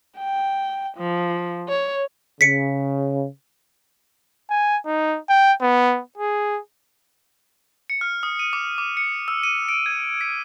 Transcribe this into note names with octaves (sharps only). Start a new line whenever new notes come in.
G5
F3
C#5
C#3 B6 C#7
G#5
D#4
G5
B3
G#4
C#7
F6
D#6
D#7
D6
D6
C#7
E6
D#7
D7
G#6
B6